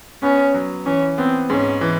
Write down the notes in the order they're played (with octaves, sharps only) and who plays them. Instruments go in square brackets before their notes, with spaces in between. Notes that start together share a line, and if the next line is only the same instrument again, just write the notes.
[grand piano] B3 [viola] C#4
[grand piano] F#3
[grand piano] E3 [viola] C#4
[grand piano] B3 [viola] C4
[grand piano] G#2 [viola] C#4
[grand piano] E3